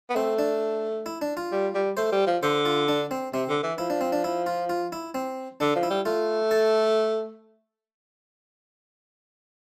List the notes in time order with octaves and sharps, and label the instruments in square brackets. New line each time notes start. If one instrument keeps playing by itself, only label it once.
[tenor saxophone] B3
[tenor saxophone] A3 [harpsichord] C4
[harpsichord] D4
E4
D4
F4
[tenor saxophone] G3
G3
[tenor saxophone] A3 [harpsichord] C5
[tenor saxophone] G3
F3
[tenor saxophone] D3 [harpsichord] C5
[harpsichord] F4
D4
C4
[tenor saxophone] C3 [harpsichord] C4
[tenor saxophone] D3
E3
[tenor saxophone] F3 [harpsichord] E4
[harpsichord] D4
C4
D4
E4
F4
F4
E4
C4
[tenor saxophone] D3 [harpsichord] D4
[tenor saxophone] F3
[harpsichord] E4
[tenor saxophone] G3
[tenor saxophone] A3 [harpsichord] F4
[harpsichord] A4